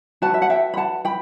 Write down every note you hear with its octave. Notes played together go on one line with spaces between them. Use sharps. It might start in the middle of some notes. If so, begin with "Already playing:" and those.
F#4 B4 F#5 A5
E5
F#5
E5 G5
B5
F#5 A5
G5 B5